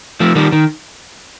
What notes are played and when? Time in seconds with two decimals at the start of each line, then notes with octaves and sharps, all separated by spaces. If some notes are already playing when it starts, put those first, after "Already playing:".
0.20 F3 A3
0.35 D#3 G3
0.52 D#3